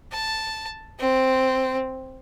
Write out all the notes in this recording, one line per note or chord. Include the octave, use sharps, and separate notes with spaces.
A5
C4